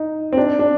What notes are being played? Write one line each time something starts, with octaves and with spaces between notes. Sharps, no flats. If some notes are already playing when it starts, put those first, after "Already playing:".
Already playing: D#4
C4
D4
D4